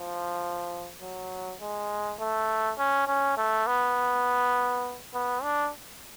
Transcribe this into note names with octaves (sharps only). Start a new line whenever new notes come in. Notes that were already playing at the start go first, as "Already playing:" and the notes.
Already playing: F3
F#3
G#3
A3
C#4
C#4
A3
B3
B3
D4